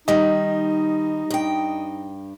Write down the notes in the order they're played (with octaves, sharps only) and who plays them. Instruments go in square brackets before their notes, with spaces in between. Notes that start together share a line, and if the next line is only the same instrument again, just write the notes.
[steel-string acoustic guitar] D#3 G3 [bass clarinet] D#4 [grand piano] D#5
[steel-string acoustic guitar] G2 G5